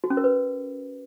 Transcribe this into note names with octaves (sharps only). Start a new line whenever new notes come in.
F#4
C#4
A#4
B4